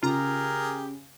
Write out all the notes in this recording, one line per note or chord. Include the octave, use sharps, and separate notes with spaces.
C#3 F4 G4 G#4 A#4 A#5